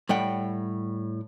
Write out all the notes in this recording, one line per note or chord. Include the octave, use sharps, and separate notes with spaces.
A2 G3 F#5 G5